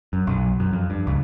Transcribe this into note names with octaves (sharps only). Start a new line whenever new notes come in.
F#2
B1
F#2
F2
G2
C#2